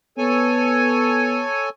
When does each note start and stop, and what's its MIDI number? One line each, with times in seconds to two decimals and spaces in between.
0.18 1.44 59
0.18 1.69 69
0.18 1.69 73
0.18 1.69 80